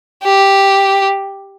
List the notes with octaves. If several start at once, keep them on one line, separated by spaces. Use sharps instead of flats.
G4